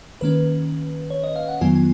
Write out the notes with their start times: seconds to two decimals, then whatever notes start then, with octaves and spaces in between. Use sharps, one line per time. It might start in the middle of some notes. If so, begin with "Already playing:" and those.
0.21 D#3 A#3 C#4 B4
1.10 C#5
1.24 D#5
1.36 F5
1.48 F#5
1.61 F2 D#3 F#3 B3 F4 G#5
1.75 G#5